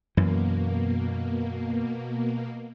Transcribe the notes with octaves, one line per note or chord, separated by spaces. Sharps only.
F#2 B2 E3 A#3